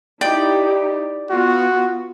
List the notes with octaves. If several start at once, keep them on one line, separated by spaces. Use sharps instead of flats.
D#4 E4 G4 D5 G5
B3 F4 F#4